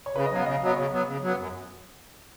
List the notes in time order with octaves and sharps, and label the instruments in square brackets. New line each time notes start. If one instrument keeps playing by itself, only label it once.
[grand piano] C#5
[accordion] C#3 [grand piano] B4
[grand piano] D#5
[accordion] F#3 B3 [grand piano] F5
[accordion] C#3 [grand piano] D#5
[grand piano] F5
[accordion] F#3 B3 [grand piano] D#5
[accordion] C#3 [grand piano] C#5
[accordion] F#3 B3
C#3
F#3 B3
F#2